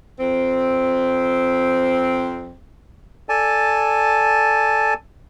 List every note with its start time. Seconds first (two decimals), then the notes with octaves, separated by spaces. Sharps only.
0.20 F2 C4
3.29 A4 D5 G#5 A5